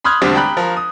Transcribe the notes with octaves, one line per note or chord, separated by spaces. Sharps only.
B5 C6 D#6 F6 F#6 G#6
E1 D2 G3 C4 D4 D#6
G5 A#5 B5 F#6
F3 A#4
D#6